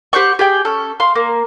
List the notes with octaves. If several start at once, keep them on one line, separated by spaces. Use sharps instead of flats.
G4 C5 F#5 C#6
G4 G#4 G5
C#4 A4
F5 C6
A#3